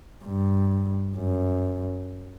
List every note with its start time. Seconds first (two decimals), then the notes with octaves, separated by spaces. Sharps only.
0.24 G2
1.17 F#2